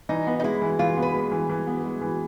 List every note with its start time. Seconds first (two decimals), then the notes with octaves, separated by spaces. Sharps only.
0.09 E3 D#4
0.27 B3
0.40 D#4
0.43 G#3 E4
0.62 E3
0.79 E3 F4
0.97 B3
1.02 B4
1.14 G#3
1.32 E3
1.49 E3
1.67 B3
1.84 G#3
2.01 E3